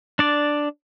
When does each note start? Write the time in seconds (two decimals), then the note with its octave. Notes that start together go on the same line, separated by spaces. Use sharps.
0.19 D4 D5